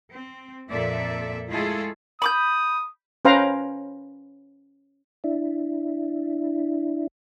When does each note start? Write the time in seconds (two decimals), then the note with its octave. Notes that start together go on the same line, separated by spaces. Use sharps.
0.13 C4
0.69 F2 A#2 A#3 A4 D5 E5
1.49 G#3 A3 E4 F4 G#4 A4
2.22 B5 D6 D#6 G6
3.25 C#4 B4 C5 F5 G5 A#5
5.24 D4 E4